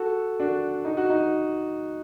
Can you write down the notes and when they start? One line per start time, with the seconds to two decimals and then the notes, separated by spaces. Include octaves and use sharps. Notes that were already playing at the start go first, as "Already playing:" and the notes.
Already playing: F#4 A4
0.40 D4 F#4
0.85 D#4
0.97 F#4
1.10 D#4